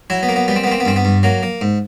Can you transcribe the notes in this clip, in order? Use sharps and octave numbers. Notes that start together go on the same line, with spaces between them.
F#3 E4
B3
A#3
B3
G3 B3
C4
B3
A#3 C4
B3
G2 C4
B3
G2
F#3 A#3
A#3
G#2